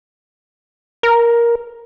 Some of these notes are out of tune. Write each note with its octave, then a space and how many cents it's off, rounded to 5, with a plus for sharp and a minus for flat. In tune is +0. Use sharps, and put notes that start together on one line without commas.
A#4 +10